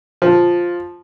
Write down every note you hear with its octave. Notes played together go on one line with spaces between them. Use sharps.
F3